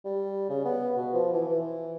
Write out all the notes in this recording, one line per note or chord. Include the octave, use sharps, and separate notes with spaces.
G3
C#3
B3
B2
F3
E3
E3